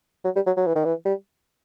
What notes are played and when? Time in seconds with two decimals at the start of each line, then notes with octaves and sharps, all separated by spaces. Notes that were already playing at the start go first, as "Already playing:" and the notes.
0.25 F#3
0.36 G3
0.46 F#3
0.57 F#3
0.67 E3
0.76 D#3
0.85 E3
1.05 G3